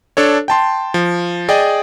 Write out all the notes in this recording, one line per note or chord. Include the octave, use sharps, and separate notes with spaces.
D4 A4 C#5
G5 A5 C6
F3
G#4 D5 D#5 G5